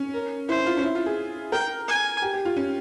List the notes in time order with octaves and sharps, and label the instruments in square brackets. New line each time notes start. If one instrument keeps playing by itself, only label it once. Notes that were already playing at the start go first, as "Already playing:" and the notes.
Already playing: [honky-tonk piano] C#4
[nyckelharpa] A#4
[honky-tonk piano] E4 [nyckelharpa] C5
[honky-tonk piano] F4
C#4
E4
F4
G#4
[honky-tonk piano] A#4 [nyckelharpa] G5
[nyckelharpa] G#5
[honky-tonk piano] G4
G4
F4
C#4